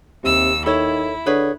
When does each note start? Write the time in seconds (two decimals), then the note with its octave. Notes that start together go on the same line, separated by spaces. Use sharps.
0.24 D#2 C3 E6
0.66 D#3 E4 A4 C#5
1.26 D3 G#4 B4 C#5